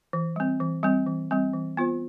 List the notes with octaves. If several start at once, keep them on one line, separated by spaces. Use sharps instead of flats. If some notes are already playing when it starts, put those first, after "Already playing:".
E3
G3 C4
E3
G3 C4
E3
G3 C4
E3
B3 F4 C5